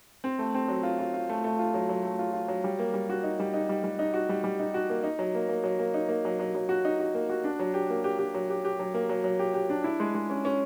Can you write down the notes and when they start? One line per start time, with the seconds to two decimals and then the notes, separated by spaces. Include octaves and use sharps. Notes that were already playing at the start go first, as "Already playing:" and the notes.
0.24 C4
0.39 A3
0.54 C4
0.68 F#3
0.83 F4
0.99 F4
1.14 F4
1.29 A3
1.44 A3
1.59 F4
1.74 F#3
1.89 F#3
2.03 A3
2.19 F4
2.33 F4
2.48 F#3
2.64 G3
2.79 A#3
2.94 G3
3.10 F#4
3.24 D#4
3.40 G3
3.54 D#4
3.69 G3
3.84 G3
3.99 D#4
4.14 F#4
4.29 G3
4.44 G3
4.60 D#4
4.74 F#4
4.90 A#3
5.04 D#4
5.19 F#3
5.35 A#3
5.49 A#3
5.64 F#3
5.79 A#3
5.94 D#4
6.09 A#3
6.25 F#3
6.39 F#3
6.55 F#3
6.69 F#4
6.85 D#4
6.99 F#4
7.14 A#3
7.29 F#4
7.44 D4
7.59 F#3
7.74 G4
7.90 A#3
8.04 G4
8.19 G4
8.34 F#3
8.50 G4
8.65 G4
8.79 F#3
8.94 A#3
9.09 F#3
9.24 F#3
9.39 G4
9.54 G4
9.70 D4
9.84 E4
10.00 G#3
10.15 G#3
10.30 C#4
10.45 C#4